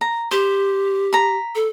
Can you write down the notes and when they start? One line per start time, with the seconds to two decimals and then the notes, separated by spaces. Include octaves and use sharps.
0.01 A#5
0.31 G4 C5
1.13 A#5 B5
1.55 A4